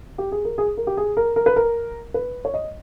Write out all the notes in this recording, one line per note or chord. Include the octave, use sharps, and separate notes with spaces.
G4
G#4
A#4
G#4
A#4
G4
G#4
A#4
A#4
B4
A#4
B4
C#5
D#5